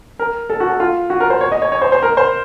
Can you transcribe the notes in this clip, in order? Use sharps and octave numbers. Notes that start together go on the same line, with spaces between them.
A#4
A4
F#4
A4
F4
F#4
A#4
C5
C#5
D#5
C#5
C#5
C5
C5
A#4
C5